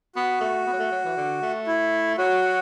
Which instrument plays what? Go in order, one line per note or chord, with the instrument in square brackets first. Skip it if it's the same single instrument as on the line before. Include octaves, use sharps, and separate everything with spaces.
[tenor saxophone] B3 [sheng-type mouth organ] F#4
[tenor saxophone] A3
B3
F#3
A3
F#3
E3
D3
A3
[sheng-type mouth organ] E4
[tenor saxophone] F#3 [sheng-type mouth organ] F#4